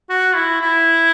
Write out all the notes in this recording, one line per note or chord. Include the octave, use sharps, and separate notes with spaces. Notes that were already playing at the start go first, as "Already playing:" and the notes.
F#4
E4
E4